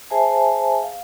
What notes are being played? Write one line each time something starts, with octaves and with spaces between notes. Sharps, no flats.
G#4 C5 E5 G#5 A5
F5